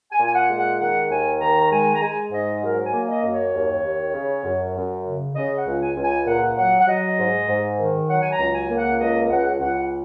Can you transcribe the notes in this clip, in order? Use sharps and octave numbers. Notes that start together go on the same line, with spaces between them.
G#5
A#2
G#5
F#5
G#3
F#5
D#3 F#5
D#2 G#5
D#3 A#5
A#5
G#3 G#5
A#5
G#3 G#5
G#2 D#5
F#3 A#4
G#5
A#3
D#5
F#2
C#5
D#2
D#2
C#3
F#2
F#2
C#3
C#3 D#5
F#5
C#2
G#5
C#2
G#5
A#2 F#5
F#3 F#5
F#5
F#3 D#5
G#2
G#2
D#3
F#3 F#5
G#5
A#5
C#2
G#5
A#3
F#5
C#2 D#5
C#2 F#5
C#2 F#5